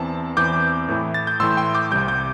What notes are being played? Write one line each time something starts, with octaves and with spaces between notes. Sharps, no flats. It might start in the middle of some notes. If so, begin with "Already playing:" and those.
Already playing: E2 E3 C4 A5
E2 E3 C4 D6 G6
A2 E3 A3 E4
A6
G6
A2 E3 A3 E4 C6 E6
G5 C6
D6 G6
C2 C3 G3 D6 G6
D6 G6